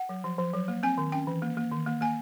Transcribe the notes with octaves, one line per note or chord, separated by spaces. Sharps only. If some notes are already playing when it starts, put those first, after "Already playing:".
Already playing: F#5
F#3
F3
F3
F#3
A#3
C4 G#5
D#3
C#4 G5
E3
A#3
A#3
D#3
A#3
A#3 G#5